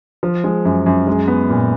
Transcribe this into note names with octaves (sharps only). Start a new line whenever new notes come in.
F3
G#3
F#2
F#2
G#3
B3
A#2